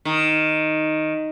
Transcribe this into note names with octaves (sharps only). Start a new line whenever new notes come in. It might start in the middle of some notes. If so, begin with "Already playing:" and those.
D#3